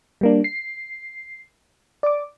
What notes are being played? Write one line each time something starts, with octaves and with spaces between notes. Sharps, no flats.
G3 A#3 D4
C7
D5 D6